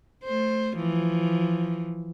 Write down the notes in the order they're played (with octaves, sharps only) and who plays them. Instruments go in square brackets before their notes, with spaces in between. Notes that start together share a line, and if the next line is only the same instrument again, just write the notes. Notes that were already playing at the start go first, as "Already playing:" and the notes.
[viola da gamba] A3 C5
E3 F3